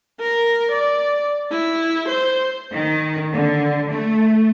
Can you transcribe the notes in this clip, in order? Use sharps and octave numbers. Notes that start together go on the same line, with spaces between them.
A#4
D5
E4
C5
D#3
D3
A3